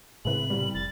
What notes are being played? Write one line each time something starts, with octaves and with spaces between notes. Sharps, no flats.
A2 C#3 G#3 C4 E4 B4 F#7
C2 G3
F1 A6